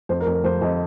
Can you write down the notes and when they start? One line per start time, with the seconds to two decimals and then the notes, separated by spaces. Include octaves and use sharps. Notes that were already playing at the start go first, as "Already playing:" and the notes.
0.09 F2 C5
0.20 A#4
0.27 F2
0.32 A#4
0.44 F2 C5
0.62 F2 D#5